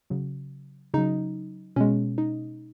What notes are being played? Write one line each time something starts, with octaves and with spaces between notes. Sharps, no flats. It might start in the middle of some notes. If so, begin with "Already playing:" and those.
C#3 F#3
C#3 F#3 D#4
B2 G#3 C#4
D#4